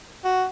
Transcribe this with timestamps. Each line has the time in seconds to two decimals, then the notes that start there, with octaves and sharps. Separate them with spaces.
0.24 F#4